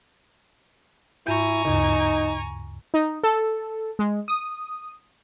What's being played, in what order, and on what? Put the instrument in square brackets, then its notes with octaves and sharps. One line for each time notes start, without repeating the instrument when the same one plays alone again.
[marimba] G#2 G6 [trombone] E4 [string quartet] G#5 A#5 C#6
[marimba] D2 G2 C#3 [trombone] D#4
[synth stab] D#4
A4
G#3
D#6